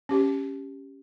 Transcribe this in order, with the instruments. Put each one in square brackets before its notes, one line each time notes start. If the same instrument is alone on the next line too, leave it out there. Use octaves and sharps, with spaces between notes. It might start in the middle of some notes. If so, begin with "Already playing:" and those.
[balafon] C#4 G4